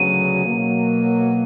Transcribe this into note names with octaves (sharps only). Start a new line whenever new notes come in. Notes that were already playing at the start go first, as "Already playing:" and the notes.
Already playing: D2 C#3 F#3 B3 D#7
B2 F#3 A#3